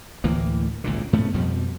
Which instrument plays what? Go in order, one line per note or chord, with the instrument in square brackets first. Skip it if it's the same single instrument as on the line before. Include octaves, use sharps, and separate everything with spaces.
[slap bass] D2 A2 E3 A#3
G#1 C#2 A#2 D3
G#2 A3 B3 C#4
F2 B2 F3 G3